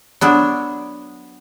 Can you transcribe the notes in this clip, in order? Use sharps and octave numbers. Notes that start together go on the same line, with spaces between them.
F#3 B3 D4